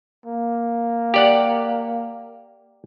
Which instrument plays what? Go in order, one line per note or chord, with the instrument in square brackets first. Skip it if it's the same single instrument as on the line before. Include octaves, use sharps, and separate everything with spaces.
[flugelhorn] A#3
[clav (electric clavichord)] G4 D5 F#5